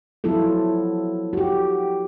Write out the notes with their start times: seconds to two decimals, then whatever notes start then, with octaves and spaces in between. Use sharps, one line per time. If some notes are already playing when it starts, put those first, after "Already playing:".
0.24 F3 F#3 B3 E4 F4 A4
1.33 F#4 G4